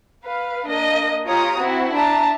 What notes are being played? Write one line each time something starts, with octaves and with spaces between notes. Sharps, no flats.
B4 F5
A#3 D4 D#5
F4 G4 C#5 A#5 D#6
C4 E4 F#4
D4 E5 A5 A#5